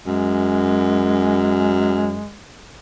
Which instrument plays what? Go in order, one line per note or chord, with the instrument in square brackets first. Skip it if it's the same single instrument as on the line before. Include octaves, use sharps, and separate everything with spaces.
[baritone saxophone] F#2 [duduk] G#3